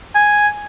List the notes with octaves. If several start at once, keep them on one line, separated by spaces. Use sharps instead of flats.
G#5